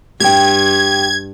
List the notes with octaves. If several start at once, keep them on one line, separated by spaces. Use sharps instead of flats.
G2 G4 G5 G#6